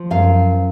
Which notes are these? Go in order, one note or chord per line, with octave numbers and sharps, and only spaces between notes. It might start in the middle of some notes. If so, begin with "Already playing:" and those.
Already playing: F3
F#2 F5